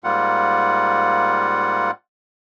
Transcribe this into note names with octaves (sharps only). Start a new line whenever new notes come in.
G#2 G3 A#3 F4 F#5